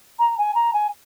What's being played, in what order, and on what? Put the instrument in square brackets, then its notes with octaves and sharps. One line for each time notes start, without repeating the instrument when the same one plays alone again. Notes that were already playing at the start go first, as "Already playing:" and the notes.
[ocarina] A#5
G#5
A#5
G#5